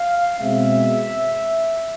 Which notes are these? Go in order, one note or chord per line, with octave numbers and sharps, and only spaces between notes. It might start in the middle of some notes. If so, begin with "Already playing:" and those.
Already playing: F5
B2 G#3 C4 E5